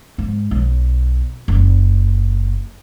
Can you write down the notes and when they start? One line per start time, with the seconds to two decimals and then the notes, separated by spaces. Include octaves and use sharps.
0.18 G#2
0.51 B1
1.48 F#1